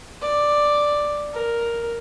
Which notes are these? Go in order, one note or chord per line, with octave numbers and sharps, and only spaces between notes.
D5
A#4